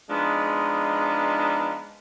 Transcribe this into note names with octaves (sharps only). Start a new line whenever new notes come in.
F3 G#3 B3 D4 D#4